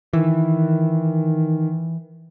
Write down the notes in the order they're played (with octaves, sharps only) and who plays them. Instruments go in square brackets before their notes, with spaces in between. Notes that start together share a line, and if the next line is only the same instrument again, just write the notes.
[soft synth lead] D#3 [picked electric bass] E3